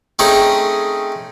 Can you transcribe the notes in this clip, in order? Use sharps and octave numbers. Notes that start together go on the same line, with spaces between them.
A3 C4 C#4 D#4 G#4